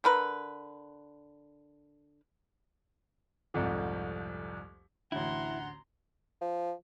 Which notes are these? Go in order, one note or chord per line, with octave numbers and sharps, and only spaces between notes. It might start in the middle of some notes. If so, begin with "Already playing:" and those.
D3 A#4 B4
C2 F2 G#2 F3 A3
A1 D2 D3 E4 F#5 A#5 C6
F3